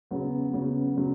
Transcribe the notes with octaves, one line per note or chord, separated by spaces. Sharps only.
C#3 F#3 B3
C#3 F#3 B3
C#3 F#3 B3